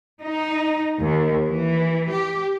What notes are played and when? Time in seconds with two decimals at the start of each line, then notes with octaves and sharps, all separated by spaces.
0.22 D#4
1.02 D#2
1.47 E3
2.11 G4